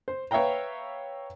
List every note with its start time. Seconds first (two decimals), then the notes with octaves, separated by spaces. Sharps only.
0.08 C5
0.31 B4 C#5 E5 F5 G5 A#5